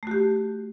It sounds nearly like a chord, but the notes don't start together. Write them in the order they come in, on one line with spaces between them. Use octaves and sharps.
A3 F#4 G4